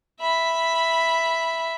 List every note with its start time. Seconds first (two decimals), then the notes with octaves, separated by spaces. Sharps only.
0.20 E5 B5